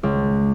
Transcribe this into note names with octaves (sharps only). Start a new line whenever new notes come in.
C#2